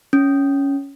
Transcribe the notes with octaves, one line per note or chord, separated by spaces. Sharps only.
C#4